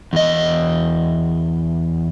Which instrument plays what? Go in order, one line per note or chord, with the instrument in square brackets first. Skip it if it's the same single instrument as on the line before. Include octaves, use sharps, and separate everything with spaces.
[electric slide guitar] E2 D#5